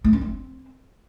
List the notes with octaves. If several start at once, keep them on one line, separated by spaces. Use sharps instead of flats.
A3
C#4
C4